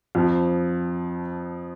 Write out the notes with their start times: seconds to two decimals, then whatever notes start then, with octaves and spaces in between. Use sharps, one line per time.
0.15 F2 F3